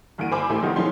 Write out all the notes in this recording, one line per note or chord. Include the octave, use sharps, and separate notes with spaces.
G2 E3 A#3 F#4 D7 D#7
C5 G#5 B5 D6 E6
A1 A2 A3 G4 G#5 C6
C3 D#3 F3 G3 B3 D#4
B2 F3 G#3 C#4 C6